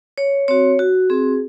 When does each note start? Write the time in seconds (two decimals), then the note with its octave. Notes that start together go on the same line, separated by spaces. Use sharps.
0.18 C#5
0.48 C4 F#4 C#5
0.79 F#4
1.10 C4 F#4 G#4